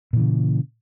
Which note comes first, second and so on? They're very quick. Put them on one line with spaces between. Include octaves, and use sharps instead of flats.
A#2 E3 C#3